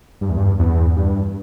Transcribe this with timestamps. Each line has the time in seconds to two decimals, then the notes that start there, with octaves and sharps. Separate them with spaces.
0.21 G2
0.30 E2
0.37 G2
0.60 E2
0.97 G2